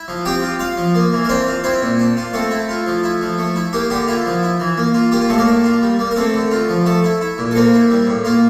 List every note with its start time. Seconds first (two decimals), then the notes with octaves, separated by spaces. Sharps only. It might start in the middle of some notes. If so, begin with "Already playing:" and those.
Already playing: E4
0.08 F3
0.25 C4 G4 G5
0.42 F4
0.59 F4 F5
0.77 F3
0.95 A#3
1.13 E3
1.24 A#4
1.29 C4 D4 C5
1.47 F4
1.64 C4 E4 C5
1.82 A#2
1.99 D4
2.17 F4
2.33 A3 C4 A4
2.51 E4
2.69 F4
2.87 F3
3.04 E4
3.21 F3
3.38 A3
3.56 E4
3.73 A#3 G4
3.90 D3 G4
4.07 E4 F4
4.26 F3
4.43 E4
4.60 E3
4.78 A#3
4.94 F4
5.12 A#3 G4
5.21 F4
5.29 A2 A3 A4
5.38 A#3 A#4
5.47 D4
5.64 F4
5.82 G3
5.99 A#3
6.11 A#4
6.16 A3 C4 A4
6.34 D3
6.51 F4
6.68 F3
6.86 A3 A4
7.04 E4
7.21 E4
7.38 A#2
7.51 A4
7.55 A#3 C4 A#4
7.74 E4
7.90 G3
8.07 A2
8.25 A#3 F4